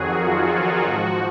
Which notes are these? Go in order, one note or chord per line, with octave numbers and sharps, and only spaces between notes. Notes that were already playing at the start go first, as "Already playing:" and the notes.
Already playing: F2 D#3 F#3 F#4 G#4
F4
F#4
G#2 F3